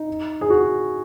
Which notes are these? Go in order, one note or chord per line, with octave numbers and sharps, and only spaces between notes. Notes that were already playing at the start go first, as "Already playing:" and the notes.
Already playing: D#4
G#4
F#4